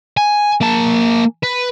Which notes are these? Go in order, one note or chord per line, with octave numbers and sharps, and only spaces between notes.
G#5
A#3 A5
B4